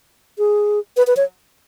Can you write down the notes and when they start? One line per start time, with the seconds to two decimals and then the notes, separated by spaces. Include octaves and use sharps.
0.38 G#4
0.97 B4
1.07 B4
1.17 C#5